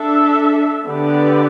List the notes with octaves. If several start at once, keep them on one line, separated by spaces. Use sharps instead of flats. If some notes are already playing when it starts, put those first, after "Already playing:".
Already playing: D4 A4 E5
D3 B3 G4 B4 D5